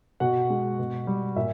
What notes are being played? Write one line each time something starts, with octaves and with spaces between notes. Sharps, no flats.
B2 F#4 F#5
G#3
B2
G3
A#2 E5